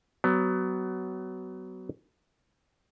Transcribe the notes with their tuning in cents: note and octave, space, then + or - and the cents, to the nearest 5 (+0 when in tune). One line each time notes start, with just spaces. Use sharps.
F#3 +25 B3 +20